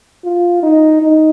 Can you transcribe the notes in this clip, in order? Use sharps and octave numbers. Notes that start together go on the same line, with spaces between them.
F4
D#4
D#4